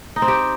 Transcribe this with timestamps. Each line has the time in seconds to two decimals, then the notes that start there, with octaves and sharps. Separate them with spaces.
0.16 D#4
0.22 C4
0.28 G4